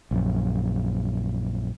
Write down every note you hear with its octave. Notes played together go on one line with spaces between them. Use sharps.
A#1 F#2